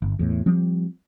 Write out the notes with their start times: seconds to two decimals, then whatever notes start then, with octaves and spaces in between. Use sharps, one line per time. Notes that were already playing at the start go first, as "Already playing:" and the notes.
0.02 G1
0.19 E2 A2
0.46 F3 G3 C4